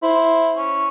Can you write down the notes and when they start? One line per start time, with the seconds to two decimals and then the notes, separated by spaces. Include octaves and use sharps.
0.03 E4 C5
0.56 C#4